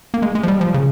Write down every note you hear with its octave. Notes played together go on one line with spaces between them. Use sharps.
A#3
G#3
G#3
F3
G3
F3
C#3